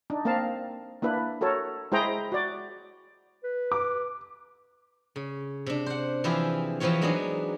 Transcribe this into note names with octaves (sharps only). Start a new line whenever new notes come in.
D4 D#4
A#3 C4 A#4 F5 A5
A#3 D4 E4 B4
F#4 A4 A#4 C#5
G#3 E4 G#4 C5 G5 A#5
F#4 D5
B4
D6
C#3
C3 D4
C5 F#5
E3 F3 E4 F4 G4 G#4
E3 F3 B3 C4 F4 C#5
F#3 G#3 B3 D4 D#4 G#4